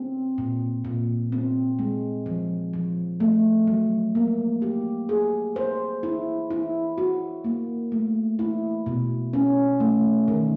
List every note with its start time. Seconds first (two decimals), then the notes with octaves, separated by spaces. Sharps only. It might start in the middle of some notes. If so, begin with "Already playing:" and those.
Already playing: C4
0.38 A#2
0.85 A#2
1.32 C4
1.79 G#3
2.26 F3
2.73 F3
3.20 A3
3.67 F#3
4.15 A#3
4.62 G4
5.09 G#4
5.56 C5
6.03 E4
6.51 E4
6.98 F#4
7.44 A#3
7.92 A3
8.39 E4
8.86 B2
9.33 C#4
9.80 A3
10.28 D#3